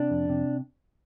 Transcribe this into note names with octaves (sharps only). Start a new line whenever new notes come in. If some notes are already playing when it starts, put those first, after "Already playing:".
Already playing: C3 D4
F2
C3